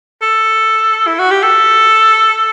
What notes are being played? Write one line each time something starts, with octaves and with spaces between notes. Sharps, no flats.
A4
E4
F#4
G4
A4